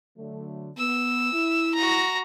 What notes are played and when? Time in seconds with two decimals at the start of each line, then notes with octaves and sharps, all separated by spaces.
0.18 D3 F#3 A3
0.77 B3 E6
1.33 E4
1.74 F#4 A#5